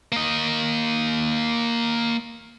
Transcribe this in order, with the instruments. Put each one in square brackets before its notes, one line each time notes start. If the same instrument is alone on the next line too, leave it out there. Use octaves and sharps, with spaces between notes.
[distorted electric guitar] A#3 D#5